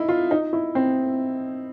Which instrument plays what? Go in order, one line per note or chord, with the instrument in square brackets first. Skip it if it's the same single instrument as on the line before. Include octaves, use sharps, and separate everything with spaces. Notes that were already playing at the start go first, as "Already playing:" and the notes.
Already playing: [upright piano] D#4 E4
F4
D#4
E4
C4